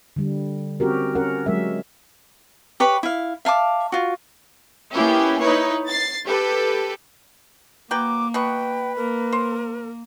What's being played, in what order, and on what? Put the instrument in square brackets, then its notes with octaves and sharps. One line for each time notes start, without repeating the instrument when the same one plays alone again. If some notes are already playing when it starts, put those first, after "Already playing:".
[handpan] D3 G3
C4 C#4 F#4 G4 A#4
C#4 A#4 F#5
F#3 G#3 A#4 E5
[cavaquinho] G4 B4 C#5 B5
E4 F5
E5 F5 A5 D6
F4 F#4
[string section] A#3 B3 C#4 E4 G4
D#4 E4 B4 C#5
A6 C7
G4 A4 B4
[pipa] F#3 B4 G5 [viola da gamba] A#3 [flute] D6
[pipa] B2 B3 C#6 [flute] B4 [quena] G5
[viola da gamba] A#3 [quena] A#4
[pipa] C5